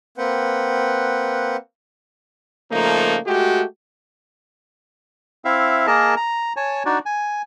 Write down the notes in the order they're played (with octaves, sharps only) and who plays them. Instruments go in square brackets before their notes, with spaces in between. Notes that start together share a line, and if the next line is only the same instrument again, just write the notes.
[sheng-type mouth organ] A#3 C4 B4 F#5 G5
[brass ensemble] C#3 F3 A3 A#3 D#4
G#3 A3 F#4 G4
[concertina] C4 E4 E5 F5
A#3 G#4 A#4 D#5 A5
A#5
C#5 G#5 A5
D4 D#4 F#4 D5
G#5